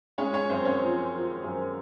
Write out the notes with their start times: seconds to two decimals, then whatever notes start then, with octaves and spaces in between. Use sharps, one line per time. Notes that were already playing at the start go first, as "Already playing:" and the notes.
0.18 G#3 C#4 C#5
0.33 C#4 C#5
0.50 F#2 C4 C5
0.65 C#4 C#5
0.82 F3
1.13 F3
1.44 F#2